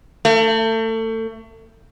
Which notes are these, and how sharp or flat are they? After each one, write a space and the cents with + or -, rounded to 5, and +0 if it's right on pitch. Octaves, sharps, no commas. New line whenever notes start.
A3 +30